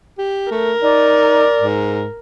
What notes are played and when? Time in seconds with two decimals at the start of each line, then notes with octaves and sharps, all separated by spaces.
0.18 G4
0.51 A3 A#4
0.83 D#4 D5
1.59 G#2